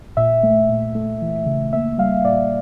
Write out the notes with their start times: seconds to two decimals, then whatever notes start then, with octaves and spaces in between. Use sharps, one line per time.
0.17 A#2 E5
0.43 A3
0.69 A#2
0.95 A3
1.21 E3
1.46 C#3
1.73 A#3 E5
1.98 G3 F5
2.25 A#2 D5